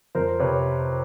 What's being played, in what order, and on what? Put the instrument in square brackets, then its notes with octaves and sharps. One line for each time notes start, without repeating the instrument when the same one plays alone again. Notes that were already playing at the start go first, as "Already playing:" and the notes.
[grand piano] F2 A#4 C5
C3 B4 C#5